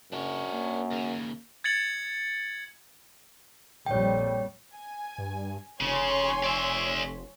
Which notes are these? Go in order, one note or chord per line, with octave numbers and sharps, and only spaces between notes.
F#1 F#2 D4 C#5
A#3
D#2 C#3
G#6 A6 C#7 F#7
A#1 F2 G3 C#5 G5
G#5
G2
F1 C#3 C#5 G#5 C6
D5 E5